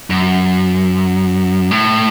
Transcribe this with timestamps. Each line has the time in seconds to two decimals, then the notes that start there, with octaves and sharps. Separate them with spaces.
0.10 F#2
1.71 A2